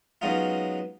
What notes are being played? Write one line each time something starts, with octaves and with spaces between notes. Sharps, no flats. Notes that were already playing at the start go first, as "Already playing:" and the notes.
F#3 G#3 B3 C#4 D#4 F4